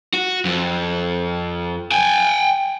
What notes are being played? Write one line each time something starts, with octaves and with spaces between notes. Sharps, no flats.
F#4
F2
G5 G#5